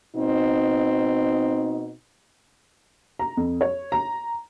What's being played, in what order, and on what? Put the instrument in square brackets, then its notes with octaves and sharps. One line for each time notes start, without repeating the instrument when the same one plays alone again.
[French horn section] B2 C4 D#4
[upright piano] A#5
F2
C#5
A#5